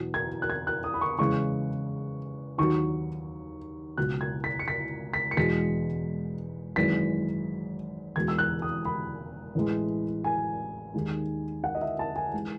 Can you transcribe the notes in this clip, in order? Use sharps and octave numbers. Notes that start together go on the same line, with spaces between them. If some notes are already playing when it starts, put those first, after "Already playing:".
Already playing: E2 B2 F#3
G#6
F#6
G#6
F#6
D#6
B5
C#6
E2 C#3 G#3 C#6
D#2 D#3 F#3 C#6
C#2 B2 F#3 F#6
G#6
B6
C#7
B6
B6
C#7
E1 E2 B2 G#3 B6
G#1 F#2 E3 G#3 B6
E1 E2 B2 G#3 G#6
E6
F#6
D#6
B5
A1 A2 E3 G#3
G#5
D#2 D#3 G#3
F#5
D#5
E5
A5
G#5
E3 G#3